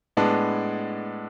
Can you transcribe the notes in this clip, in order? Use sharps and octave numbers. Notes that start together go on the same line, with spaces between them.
A2 G#3 B3 D4